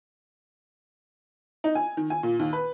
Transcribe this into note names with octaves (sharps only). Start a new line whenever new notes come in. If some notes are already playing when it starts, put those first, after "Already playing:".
D#4
G#5
D#3
G#5
A#2
D#2
B4